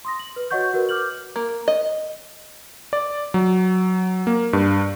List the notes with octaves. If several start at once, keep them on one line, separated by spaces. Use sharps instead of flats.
C6 D#6 A#6
F#7
B4
F#4 C#5 D#5 F#5 C#6 G6
F#4 A#4 B4
D6 F6 G6 F#7
A#3
D#5
D5
F#3
A#3
G2